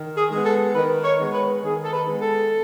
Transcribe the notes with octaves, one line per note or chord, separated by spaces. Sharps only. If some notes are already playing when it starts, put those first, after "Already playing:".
Already playing: D#3
G#4
G#3 B3
A4
D#3 B4
C#5
G#3 B3
B4
D#3 G#4
A4
B4
G#3 B3
A4